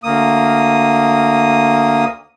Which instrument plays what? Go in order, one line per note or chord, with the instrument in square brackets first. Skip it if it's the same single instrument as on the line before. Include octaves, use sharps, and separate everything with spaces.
[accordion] D2 A#3 D#6